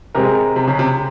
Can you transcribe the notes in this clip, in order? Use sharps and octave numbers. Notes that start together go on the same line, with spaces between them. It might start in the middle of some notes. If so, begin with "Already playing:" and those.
C3 G#3 C4 G4 A#4
C3
C#3
C3